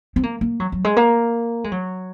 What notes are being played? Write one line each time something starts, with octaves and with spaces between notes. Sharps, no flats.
C4
A#3
A#3
F#3
F#3
G#3
A#3
G#3
F#3